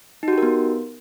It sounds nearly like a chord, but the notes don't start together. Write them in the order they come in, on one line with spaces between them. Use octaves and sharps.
D#4 F#4 G4 A#4 B3